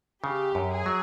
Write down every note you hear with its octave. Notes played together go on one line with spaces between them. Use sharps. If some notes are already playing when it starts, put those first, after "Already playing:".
C#3 G4
F#2
G#4
F#3